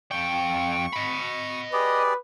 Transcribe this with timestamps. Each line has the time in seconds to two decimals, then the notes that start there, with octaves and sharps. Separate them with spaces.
0.11 F2 G5 C#6
0.93 D#5 B5
1.73 G4 G#4 B4 D5